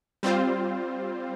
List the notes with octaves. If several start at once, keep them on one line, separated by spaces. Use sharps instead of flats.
G3 C4 F4 C5